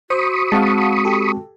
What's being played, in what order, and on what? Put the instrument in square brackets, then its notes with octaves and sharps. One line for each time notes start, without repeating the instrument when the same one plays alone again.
[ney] F#4 [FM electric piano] C5 [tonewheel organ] B5 C#6 D#6
[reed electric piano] G#3 C4 [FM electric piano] F5 F#5 A5
[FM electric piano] G4 A4